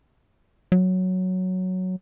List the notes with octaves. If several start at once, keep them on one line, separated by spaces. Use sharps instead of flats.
F#3